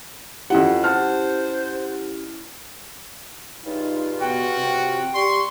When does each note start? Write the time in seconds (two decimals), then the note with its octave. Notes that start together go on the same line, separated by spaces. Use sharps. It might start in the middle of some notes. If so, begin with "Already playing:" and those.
0.50 F2 C#4 E4 G4 F#5
0.84 C5 F#5 A5 F6
3.65 G2 C#3 D#4 F4
4.20 B2 F#4 G5
4.56 C3
5.14 G3 G4 C6 C#6